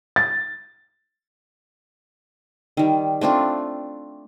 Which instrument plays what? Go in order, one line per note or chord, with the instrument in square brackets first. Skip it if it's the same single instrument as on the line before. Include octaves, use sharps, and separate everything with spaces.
[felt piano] A6
[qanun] D#3 G3
A3 C4 D4 F4